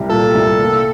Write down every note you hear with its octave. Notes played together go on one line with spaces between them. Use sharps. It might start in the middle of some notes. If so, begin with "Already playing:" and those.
Already playing: C2 G3
A#2 A4
C2
A#3